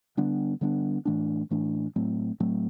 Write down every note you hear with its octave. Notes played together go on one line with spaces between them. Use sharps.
D3 G3 B3 D4
D3 G3 B3 D4
A2 E3 A3 D4
A2 E3 A3 D4
A2 F#3 A3 C4
A2 F#3 A3 C4